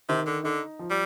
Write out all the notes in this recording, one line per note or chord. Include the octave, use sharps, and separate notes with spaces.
C3 D#3
D3
D3 D#4
F3
G3